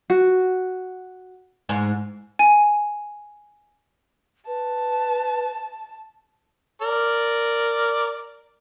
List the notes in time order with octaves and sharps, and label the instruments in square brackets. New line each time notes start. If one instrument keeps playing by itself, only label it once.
[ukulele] F#4
[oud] G#2
[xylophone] G#5
[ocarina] B4 [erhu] A5
[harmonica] A#4 D5